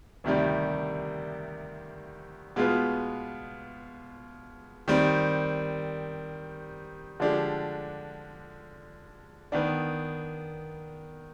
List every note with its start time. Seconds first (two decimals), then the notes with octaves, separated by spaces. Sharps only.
0.24 D2 C3 D#3 G3
2.56 B2 G#3 B3 F4
4.88 D#3 G3 C4
7.20 D3 F3 G#3 D4 G4
9.52 D#3 B3 D4